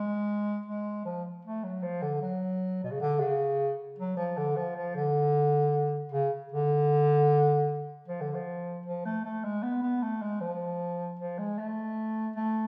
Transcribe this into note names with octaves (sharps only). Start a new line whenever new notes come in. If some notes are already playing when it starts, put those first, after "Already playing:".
Already playing: G#3
G#3
F3
A3
F#3
F3
D3
F#3
B2
C#3
D3
C#3
F#3
F3
D3
F3
F3
D3
C#3
D3
F3
D3
F3
F3
A3
A3
G#3
B3
B3
A3
G#3
F3
F3
G#3
A3
A3